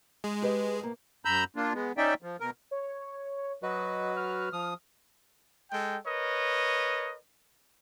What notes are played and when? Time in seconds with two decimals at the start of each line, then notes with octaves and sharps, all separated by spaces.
0.24 G#3
0.42 G4 B4 D#5
0.80 A2 A#3
1.25 F#2 A#5 B5 E6 G6
1.56 A#3 D4 F4
1.74 G#3 B3
1.97 C#4 D#4 D5 E5 G5
2.22 F3
2.40 B2 A#4
2.71 C#5
3.63 F#3 F#4 B4 D#5
4.16 F6
4.53 F3 D#6
5.72 G#3 A4 G5
6.06 A#4 B4 C#5 D#5